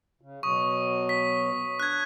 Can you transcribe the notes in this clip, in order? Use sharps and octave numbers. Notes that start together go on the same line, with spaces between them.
C#3
B2 F#3 C#6 D#6
B6
D4 F#6 G#6